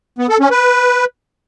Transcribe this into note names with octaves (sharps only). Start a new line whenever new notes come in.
B3
A4
C#4
B4